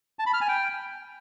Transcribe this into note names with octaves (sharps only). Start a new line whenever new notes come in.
A5
B5
F6
G#5
G5